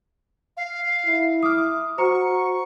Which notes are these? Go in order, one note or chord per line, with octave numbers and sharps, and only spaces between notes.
F5
E4
D6 D#6 F6
F#4 C5 A#5 C#6 C#7